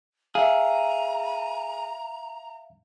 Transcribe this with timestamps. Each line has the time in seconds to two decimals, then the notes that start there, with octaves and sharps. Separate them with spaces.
0.35 G#4 E5 F5 A#5